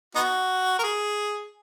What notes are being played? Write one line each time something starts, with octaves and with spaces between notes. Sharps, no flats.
B3 D#4 F#4
A#4
G#4